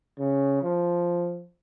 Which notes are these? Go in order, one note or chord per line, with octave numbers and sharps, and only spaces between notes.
C#3
F3